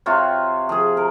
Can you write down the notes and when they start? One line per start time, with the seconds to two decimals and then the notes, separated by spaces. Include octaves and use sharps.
0.06 C3 F4 F#4 C#5
0.69 F3 G#4
0.97 A#4